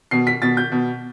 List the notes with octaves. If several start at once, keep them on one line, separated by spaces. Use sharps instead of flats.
B2 C7
B6
B2 A6
G6
B2